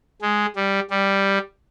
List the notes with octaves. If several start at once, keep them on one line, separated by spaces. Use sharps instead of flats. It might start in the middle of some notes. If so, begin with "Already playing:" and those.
G#3
G3
G3